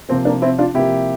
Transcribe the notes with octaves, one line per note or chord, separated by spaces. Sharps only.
C3 F3 A#3 C4
A#3 D4
C4 E4
D4 F4
C3 F3 A#3 E4 G4